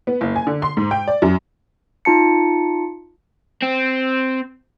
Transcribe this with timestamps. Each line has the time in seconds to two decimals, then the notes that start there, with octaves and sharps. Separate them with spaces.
0.07 B3
0.21 F#1
0.36 G#5
0.47 D3
0.62 C6
0.77 G#2
0.91 G5
1.08 D5
1.22 F#2
2.05 D#4 F4 A5 C#7
3.63 C4